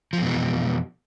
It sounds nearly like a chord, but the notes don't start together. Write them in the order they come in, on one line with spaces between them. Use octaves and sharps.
F3 F2 B2 E3